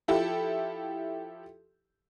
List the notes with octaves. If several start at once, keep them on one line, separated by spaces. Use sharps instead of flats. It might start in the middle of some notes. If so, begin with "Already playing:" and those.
F3 E4 G4 A4